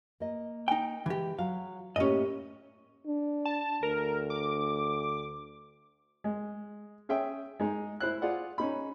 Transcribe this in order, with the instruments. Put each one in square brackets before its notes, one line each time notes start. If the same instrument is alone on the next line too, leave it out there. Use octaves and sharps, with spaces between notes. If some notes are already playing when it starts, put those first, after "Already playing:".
[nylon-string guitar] A#3 D#5
[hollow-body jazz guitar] D#4 G5
[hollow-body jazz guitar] E3 G4 [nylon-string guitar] G#3
[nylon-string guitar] F#3 [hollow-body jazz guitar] F5
[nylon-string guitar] A2 A#3 G4 [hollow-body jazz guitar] C#4 D#5
[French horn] D4
[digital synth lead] A5
[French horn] D2 [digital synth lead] A#4
[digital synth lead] D6
[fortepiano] G#3
C#4 G#4 E5 G5
G#3 D#4 G#4
E4 C5 F#6
F4 G#4 D5 F#5
C#4 D#4 B5